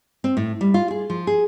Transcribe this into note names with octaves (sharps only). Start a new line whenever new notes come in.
C4
A2
G3
F4
G#4
F3
G#4